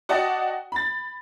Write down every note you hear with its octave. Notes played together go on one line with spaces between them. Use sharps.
F#4 D5 D#5 F#5 G5 A5
B5 A6